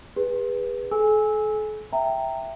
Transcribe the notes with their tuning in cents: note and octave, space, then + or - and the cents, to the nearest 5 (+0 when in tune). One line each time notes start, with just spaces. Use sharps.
G#4 -35 B4 -15
A4 -40 G#5 +0 E6 -15
E5 +0 G5 +0 A#5 -20